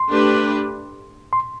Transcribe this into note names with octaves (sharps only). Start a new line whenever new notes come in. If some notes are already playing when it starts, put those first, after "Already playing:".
Already playing: C6
A3 D4 G4 B4
C6